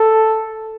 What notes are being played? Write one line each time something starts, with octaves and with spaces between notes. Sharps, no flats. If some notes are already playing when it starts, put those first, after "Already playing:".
Already playing: A4